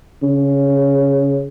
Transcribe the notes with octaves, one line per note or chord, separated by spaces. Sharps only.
C#3